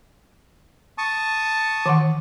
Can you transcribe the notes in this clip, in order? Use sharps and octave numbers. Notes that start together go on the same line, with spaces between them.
A5 C#6 D#6
D#3 E3 F#5